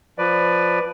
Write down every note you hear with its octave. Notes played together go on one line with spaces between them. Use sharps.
F3 B4 D5